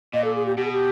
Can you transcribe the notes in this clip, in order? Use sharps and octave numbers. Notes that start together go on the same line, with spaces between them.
A#2 D#5
A4
G#4
G4
B2 G4
G#4
G4